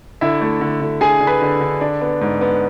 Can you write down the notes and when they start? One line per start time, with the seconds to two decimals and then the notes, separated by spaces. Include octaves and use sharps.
0.21 D3 E4 E5
0.41 A3
0.61 D3
0.81 D3
1.01 D3 G#4 G#5
1.21 D3
1.27 B4 B5
1.42 D3
1.61 D3
1.81 D4
2.01 B3
2.21 G#2
2.41 B3